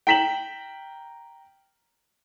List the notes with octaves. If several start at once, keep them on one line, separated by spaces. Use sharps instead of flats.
G5 A#5 B6 E7 F#7